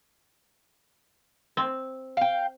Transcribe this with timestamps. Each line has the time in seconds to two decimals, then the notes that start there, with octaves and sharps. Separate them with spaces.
1.57 C4
2.17 F5 G5